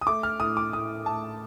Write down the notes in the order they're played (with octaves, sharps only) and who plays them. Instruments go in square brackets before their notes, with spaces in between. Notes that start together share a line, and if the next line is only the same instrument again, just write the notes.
[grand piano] D#6
A3 D6
F6
A2 D#6
D6
A2 D#6
A3 A5